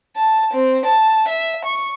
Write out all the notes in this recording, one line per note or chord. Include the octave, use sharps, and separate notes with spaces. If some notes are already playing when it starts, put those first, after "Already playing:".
A5
C4
A5
E5
C#6